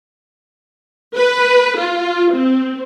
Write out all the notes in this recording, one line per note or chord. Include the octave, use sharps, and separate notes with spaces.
B4
F4
C4